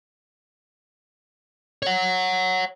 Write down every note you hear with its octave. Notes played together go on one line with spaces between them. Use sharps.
C#5 F#5